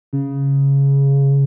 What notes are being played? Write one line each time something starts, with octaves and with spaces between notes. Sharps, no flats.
C#3